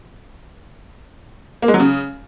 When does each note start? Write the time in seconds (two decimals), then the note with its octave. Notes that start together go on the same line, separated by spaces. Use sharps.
1.62 A#3
1.68 G#3
1.74 F#3
1.80 C#3